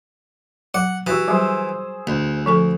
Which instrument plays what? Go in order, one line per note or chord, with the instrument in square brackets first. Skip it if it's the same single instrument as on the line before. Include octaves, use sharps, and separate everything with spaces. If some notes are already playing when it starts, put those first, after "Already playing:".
[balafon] F#3 [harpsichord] F#5
[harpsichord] E3 [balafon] F#4 G4 [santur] C#6 E6
[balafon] F#3 G3 [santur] G#4 C5
[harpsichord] D2
[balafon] F3 A4 G#5